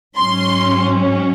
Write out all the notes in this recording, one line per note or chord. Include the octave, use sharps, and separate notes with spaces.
G#2 F#3 C#4 C6